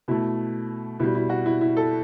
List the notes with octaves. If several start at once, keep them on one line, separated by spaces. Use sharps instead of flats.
B2 A3 E4
B2 G3 E4
E4
F#4
E4
E4
A4